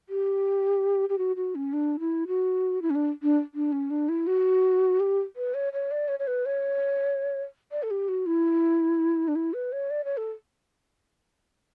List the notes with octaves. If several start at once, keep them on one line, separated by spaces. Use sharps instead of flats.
G4
G4
F#4
F#4
C#4
D4
E4
F#4
E4
C#4
D4
D4
D4
C#4
D4
E4
F#4
G4
B4
C#5
C#5
D5
C#5
C#5
B4
C#5
D5
A4
G4
F#4
E4
D4
E4
B4
C#5
D5
C#5
A4